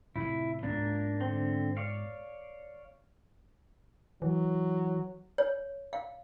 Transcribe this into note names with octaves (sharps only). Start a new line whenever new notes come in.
A2 C3 E4
G#2 A#3 B3 D4
D3 C4
C#5 D5 F5
E3 F#3
C#5
F5